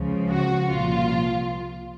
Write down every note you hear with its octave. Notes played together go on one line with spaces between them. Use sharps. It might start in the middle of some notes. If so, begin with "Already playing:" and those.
Already playing: C#2 C#3 F3
F#4
C2 A#2 F3 F4